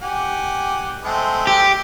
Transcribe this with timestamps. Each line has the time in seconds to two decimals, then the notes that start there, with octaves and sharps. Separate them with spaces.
0.02 G4 F#5 G#5
1.04 G#3 A3 C4
1.47 G4